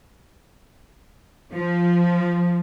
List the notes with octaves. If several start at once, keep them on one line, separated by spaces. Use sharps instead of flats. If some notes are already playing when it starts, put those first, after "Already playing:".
F3